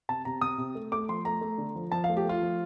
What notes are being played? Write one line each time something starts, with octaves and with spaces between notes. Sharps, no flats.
C3 A5
C3 A#5
C3 D#6
C3
A3
A3 D6
F3 C6
A3 A#5
A3
D3
F3
F3 A5
F5
A3
G4
A3 F4
F3